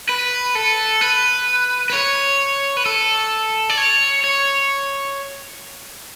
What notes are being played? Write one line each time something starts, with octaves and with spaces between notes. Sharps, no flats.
B4
A4
B4
B4
C#5
B4
A4
D5
C#5
C#5